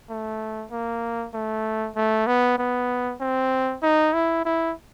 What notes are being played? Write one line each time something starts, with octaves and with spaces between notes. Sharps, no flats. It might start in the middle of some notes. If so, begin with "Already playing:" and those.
A3
A#3
A3
A3
B3
B3
C4
D#4
E4
E4